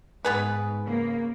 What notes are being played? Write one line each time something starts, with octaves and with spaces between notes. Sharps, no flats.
G#2 B3 G#4 B4
C#3 A#3